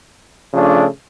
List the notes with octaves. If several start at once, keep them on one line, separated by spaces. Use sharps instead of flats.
C#3 F3 A3 D4